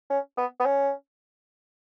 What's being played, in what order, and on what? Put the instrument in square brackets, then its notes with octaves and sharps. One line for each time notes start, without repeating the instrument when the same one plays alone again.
[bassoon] C#4
B3
B3
C#4